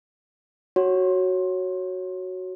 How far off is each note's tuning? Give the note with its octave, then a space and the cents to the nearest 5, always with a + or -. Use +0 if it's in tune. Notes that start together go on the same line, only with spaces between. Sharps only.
F#4 +5 C#5 -10